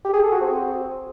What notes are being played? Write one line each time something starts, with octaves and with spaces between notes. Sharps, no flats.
G4
G#4
A4
F#4
C4